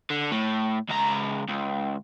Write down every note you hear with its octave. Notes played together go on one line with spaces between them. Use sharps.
D3
A2
C#2 A#5
C#2